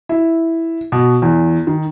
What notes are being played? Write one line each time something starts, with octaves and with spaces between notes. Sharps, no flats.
E4
B2
E2
D#3